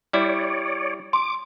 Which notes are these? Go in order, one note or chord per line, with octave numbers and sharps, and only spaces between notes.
G3 E4 C#5 D5
C6 D6